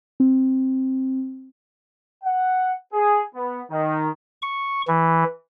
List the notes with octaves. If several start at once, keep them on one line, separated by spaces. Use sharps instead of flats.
C4
F#5
G#4
B3
D#3
C#6
E3